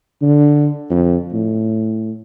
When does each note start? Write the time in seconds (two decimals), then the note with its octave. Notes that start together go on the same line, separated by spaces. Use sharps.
0.22 D3
0.90 F2
1.33 A2